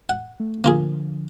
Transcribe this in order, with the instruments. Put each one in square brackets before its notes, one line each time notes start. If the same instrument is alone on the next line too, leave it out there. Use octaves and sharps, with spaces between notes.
[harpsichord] F#5
[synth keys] A3
[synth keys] D3 F3 [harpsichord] A#3 F4 G#4